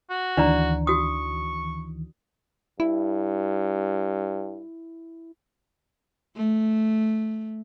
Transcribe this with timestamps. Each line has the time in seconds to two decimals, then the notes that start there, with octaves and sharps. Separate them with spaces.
0.10 F#4
0.37 D2 D#3 E3 D4 D5 A#5
0.87 F#4 C#6 D#6
2.80 G2 E4
6.36 A3